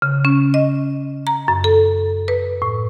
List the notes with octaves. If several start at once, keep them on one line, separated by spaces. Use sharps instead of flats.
C#3
C#4
D#5
A#5
F#2
A4
B4
A2